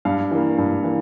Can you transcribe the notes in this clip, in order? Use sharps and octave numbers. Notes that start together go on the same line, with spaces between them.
G2 F5
E3 A#3
G2
E3 A#3